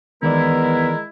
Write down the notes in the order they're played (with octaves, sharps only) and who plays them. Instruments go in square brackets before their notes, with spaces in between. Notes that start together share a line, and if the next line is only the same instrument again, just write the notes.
[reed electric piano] D#3 E3 D5 [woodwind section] G#3 E4 [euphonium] B3 [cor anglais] A#4